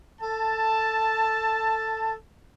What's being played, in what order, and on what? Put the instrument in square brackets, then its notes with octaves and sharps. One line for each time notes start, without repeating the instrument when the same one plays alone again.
[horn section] A4 A5